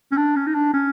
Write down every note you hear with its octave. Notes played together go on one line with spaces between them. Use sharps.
C#4
D4
C#4
D#4
D4
C#4